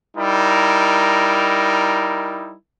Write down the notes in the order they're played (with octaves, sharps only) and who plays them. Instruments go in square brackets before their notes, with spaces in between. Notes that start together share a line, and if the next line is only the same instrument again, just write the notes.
[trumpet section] G3 D#4 E4 A#4